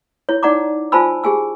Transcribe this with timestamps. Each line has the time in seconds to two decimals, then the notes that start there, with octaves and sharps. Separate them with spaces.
0.29 E4 C#5
0.43 D#4 D5 F#5 A#5 D6
0.92 F4 C5 G#5 A5 B5 E6
1.24 G4 G#4 G#5 E6